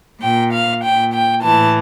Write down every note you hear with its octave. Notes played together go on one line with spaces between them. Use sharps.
A#2 G5
F5
A#2 G5
G5
A2 E3 A5